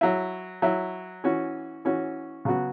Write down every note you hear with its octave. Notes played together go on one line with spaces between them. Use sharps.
F#3 E4
F#3 E4
E3 C#4 F#4
E3 C#4 F#4
C#3 F#3 B3 F#4